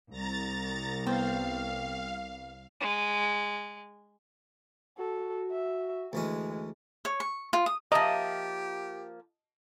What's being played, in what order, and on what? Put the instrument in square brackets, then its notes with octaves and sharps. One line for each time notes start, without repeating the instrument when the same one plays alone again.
[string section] C2 [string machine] A#5 A6
[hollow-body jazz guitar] B3 [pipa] C4 [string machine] F5
[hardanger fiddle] G#3
[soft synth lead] F#4 [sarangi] A4
[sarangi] E5
[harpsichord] D2 E3 C#4 [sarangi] G#3
[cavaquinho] C#5
C#6
F4
D#6
[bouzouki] F3 A#3 [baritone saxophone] G4 [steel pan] D#5 A5 [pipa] E5 A#5